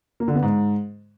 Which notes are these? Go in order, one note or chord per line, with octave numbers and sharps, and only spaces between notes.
A#3
D3
B3
G#2